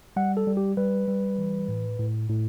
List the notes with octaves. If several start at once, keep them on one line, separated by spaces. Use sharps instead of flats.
G3 F#5
A4
G3
G4
G3 B4
G3
E3
A2
A2
A2